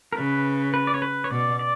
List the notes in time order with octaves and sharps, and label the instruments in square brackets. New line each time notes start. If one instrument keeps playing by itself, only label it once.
[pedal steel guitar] A#4
[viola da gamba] C#3 [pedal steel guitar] B4
[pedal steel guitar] B4
D5
C#5
B4
C#5
[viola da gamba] B2 [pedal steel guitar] D5
[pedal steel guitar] D5